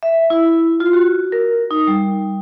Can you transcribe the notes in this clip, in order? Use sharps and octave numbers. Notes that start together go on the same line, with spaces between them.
E5
E4
F4
F#4
A#4
D#4
G3